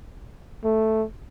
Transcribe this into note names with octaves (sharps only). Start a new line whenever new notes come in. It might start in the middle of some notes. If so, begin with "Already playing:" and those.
A3